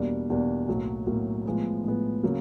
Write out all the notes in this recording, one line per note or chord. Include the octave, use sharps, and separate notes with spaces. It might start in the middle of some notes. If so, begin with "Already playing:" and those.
Already playing: E2 B2 G3 A#3 D4
E2 B2 G3 A#3 D4
B1 A2 F#3 A#3
B1 A2 F#3 A#3
A2 F3 G#3 B3
A2 F3 G#3 B3
C#3 F#3 A#3